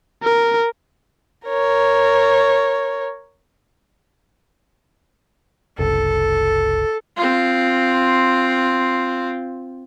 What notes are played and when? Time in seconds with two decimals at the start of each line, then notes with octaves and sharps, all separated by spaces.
0.23 A#4
1.48 A#4 C#5
5.79 F#1 C2 A4
7.17 C4 F4